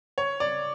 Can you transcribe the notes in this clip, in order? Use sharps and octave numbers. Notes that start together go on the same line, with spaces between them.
C#5
D5